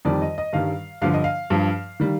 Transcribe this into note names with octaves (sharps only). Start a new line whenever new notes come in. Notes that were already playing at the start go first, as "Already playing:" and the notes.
F2 D#3 G3 D5
D#5
D#5
G2 D#3 G3 F5
G2 D3 F3 F5
D#5
F5
G2 F3
D#3 G3